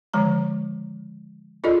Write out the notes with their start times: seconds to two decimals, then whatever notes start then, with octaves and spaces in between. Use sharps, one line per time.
0.14 D3 D#3 F3 G#3 A#5
1.64 D4 F4 G#4 A4 D5 D#5